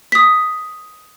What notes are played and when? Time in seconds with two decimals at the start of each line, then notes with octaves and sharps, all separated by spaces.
0.12 D#6 B6